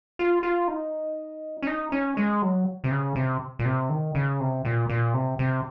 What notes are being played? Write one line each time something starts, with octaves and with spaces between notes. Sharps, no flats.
F4
F4
D#4
C#4
D#4
C#4
G#3
F#3
C3
C#3
C3
A#2
C3
D#3
C#3
C3
A#2
A#2
C3
C3